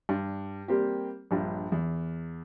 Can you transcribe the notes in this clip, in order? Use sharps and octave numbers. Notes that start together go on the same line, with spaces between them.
G2
G3 A#3 C4 G4
A#1 G2
E2